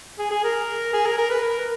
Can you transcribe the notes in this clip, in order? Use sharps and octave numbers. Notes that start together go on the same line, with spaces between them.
G#4
G#4
A#4
G#4
A#4
A#4
B4
A#4